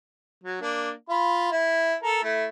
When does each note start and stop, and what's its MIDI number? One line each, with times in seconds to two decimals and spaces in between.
0.43 0.59 54
0.61 0.91 58
0.61 0.91 62
1.09 1.49 65
1.09 1.49 83
1.51 1.94 64
2.03 2.20 69
2.03 2.20 70
2.23 2.46 57
2.23 2.46 64